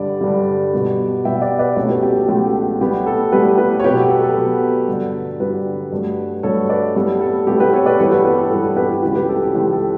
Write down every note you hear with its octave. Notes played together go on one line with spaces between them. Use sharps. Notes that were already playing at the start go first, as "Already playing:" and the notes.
Already playing: G2 D3 G3 D5
G2 D3 G3
B2 G3 B3
B2 G3 B3 E5 G5
D5 F#5
B4 D5
C#2 B2 F#3 A3 A4 C#5
G4 B4
G4
A4
C#2 B2 F#3 A3 G4
A2 G3 B3 G4
A4
A2 G3 B3 G4 B4
G4 B4
C#5
B2 F#3 B3 G4 B4
A4
A4
A4
B2 F#3 B3
G2 D3 F#3
G2 D3 F#3 G4 B4
G2 F#3 A3
G2 F#3 A3 A4 C#5
B4 D5
A2 G3 B3 A4
A4
A2 G3 B3 G4
G4 B4
A4 C#5
B4 D5
G2 E3 G3 B3 A4 C#5
G4 B4
G4 B4
A4
G2 E3 G3 B3 A4
A4
G4 B4
A4
C#2 C#3 E3 G4
G4 B4
A4
G4
C#2 C#3 E3 G4
A4